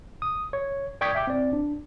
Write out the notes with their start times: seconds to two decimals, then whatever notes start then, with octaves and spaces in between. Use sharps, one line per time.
0.22 D#6
0.53 C#5
1.01 D5 G5 C#6 D#6 G#6 B6
1.15 E5 G5 D6
1.27 C4 D5
1.53 D4